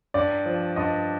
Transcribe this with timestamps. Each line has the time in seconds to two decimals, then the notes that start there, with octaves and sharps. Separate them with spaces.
0.14 G2 D5
0.46 F3
0.76 G2 D#5